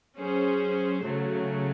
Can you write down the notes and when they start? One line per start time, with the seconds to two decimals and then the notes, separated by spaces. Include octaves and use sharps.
0.18 F#3 C#4 G#4 C5
1.04 C#3 F#3 A3